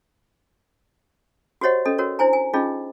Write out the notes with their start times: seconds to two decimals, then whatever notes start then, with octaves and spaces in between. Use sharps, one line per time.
1.61 F#4 G4 C5 C#5 D#5 F#5
1.85 C#4 A4 D#5
1.98 F#4 A#4 C#5
2.19 D4 E4 C5 G#5 A#5
2.33 G#5
2.54 C#4 D#4 F4 G#4 D#5